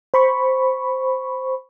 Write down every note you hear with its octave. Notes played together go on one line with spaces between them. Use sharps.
C5 B5 C#6